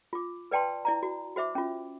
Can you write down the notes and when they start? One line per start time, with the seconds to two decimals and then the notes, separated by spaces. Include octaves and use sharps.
0.13 F4 D6
0.51 B4 D5 G5 A5 C6
0.85 E4 D5 A#5
1.03 F#4
1.36 F#4 C5 E5 D6
1.55 C#4 F4